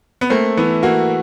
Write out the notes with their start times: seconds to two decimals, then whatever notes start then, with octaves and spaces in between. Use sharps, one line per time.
0.21 B3
0.30 A3 A#3 C4
0.57 E3 B3
0.83 A#3 F#4